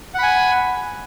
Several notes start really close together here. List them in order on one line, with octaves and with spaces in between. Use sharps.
F#5 B5 G#5